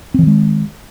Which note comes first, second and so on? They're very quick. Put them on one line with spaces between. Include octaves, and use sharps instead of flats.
C4 E3 D#3 G#3